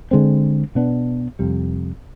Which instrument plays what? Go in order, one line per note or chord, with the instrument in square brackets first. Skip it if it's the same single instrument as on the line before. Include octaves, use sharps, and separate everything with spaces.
[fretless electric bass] D3 G#3 C4
B2 B3 D4
F2 C3 G3